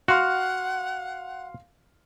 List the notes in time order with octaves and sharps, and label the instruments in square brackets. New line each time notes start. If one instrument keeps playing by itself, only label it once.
[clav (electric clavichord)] F#4 [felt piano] F5 C6 F6 [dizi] F#5